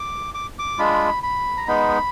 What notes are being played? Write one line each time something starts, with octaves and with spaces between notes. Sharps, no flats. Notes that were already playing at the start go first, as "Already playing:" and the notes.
Already playing: D6
D6
D6
G#3 D4 F4 B5
B5
A#5
G#3 B3 D#4 B5